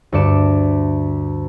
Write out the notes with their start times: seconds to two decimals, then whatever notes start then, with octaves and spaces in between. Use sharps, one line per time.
0.12 D2 G2 A4 D5 C#7 E7